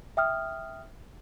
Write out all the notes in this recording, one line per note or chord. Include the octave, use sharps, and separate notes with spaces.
E5 G5 D#6 F6